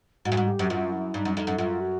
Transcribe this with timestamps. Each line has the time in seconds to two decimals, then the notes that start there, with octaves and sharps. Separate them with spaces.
0.25 G#2 F#4
0.32 G2
0.37 G#2
0.48 G4
0.59 F#2
0.70 F#2 F4
0.92 E4
1.14 G2 D#4
1.25 F#2
1.37 F2 D#4
1.47 F#2
1.58 F#2 F4
1.80 F#4